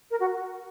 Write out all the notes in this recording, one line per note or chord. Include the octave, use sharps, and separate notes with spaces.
A#4
F#4